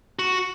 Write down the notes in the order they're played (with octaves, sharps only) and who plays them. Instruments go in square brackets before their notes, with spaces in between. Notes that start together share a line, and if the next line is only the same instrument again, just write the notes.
[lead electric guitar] F#4